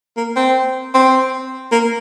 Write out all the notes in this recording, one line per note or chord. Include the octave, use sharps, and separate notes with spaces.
A#3
C4
C4
A#3